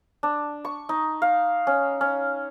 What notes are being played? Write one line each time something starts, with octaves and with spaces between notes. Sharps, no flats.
D4
C#6
D#4
F5
C#4
C#4